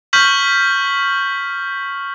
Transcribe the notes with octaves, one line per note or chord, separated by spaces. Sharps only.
C#6 F6 G6 B6 F#7